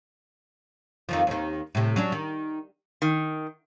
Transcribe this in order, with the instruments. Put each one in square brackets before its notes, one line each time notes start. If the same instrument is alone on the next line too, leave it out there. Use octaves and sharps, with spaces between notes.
[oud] F2 D#3 F3
D#2 D#3
A2 C3
F#3 C#4 D4
D#3
[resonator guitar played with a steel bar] D#3